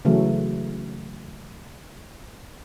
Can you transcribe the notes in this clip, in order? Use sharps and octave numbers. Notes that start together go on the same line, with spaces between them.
C#3 E3 F#3 A3